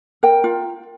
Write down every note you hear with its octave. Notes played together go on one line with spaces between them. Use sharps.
A#4 G5
F4